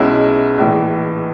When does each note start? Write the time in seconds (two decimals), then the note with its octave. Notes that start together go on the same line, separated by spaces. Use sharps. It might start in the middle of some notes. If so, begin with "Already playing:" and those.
Already playing: B1 B2 G#3 C#4 E4
0.58 A#1 A2 E3